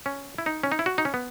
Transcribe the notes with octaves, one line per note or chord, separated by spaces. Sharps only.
C#4
E4
D#4
C#4
D#4
E4
F#4
D#4
C#4
B3